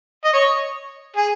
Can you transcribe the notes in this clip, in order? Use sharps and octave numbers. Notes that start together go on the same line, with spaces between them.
D#5
C#5
G#4